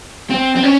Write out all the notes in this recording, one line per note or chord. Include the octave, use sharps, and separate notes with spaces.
C4
C4
C#4